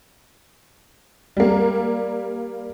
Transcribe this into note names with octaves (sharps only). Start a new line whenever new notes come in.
G3 A#3